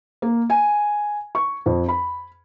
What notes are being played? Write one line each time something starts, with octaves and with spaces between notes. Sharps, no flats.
A#3
G#5
C#6
F2
B5